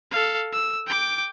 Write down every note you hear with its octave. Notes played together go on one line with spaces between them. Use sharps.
A4 F5
E6
G5 D6